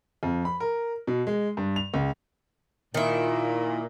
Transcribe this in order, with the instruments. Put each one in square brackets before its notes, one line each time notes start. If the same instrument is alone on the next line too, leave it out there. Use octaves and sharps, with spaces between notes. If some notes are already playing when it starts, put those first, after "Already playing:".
[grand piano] F2
B5
A#4
B2
G#3
G2
F7
C#2
[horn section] A#2 [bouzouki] D#3 E4